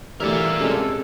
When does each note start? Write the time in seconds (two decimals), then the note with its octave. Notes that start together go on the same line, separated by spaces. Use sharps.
0.20 E3 G3 A3 A#4 D5 E5
0.60 C3 G#3 C#4 A4